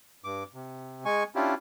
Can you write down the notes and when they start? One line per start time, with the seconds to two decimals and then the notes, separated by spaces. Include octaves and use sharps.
0.24 G2 D6
0.54 C3
1.05 G#3 G#5 C#6
1.36 C#4 D4 E4 F4 G4